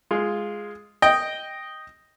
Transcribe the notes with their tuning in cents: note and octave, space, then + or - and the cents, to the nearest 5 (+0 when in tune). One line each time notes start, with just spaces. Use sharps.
G#3 +0 F4 +0
D#5 +0 G5 +0